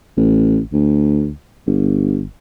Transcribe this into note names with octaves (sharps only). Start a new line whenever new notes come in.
A1
D2
G1